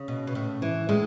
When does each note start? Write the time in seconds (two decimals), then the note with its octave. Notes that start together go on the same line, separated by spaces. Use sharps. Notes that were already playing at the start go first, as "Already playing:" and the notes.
Already playing: C#3
0.08 B2
0.27 B2
0.35 A2
0.62 E3
0.89 A2 G#3